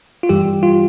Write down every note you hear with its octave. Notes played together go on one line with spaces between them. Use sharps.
F4
G2 E3 G3 G4
F4